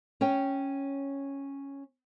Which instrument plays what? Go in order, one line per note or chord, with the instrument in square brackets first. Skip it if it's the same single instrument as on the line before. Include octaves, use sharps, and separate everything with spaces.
[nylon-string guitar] C#4 C#5 G5